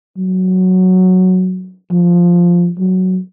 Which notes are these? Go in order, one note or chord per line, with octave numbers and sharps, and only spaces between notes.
F#3
F3
F#3